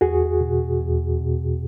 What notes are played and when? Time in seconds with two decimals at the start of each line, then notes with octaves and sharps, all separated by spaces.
0.01 E2 F#4 G#4
0.41 B2
0.81 E2
1.20 B2